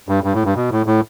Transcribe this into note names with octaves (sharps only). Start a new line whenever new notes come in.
G2
G2
A2
G2
B2
A2
A2